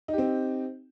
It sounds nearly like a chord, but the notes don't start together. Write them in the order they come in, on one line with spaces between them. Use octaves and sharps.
D#4 G4 C4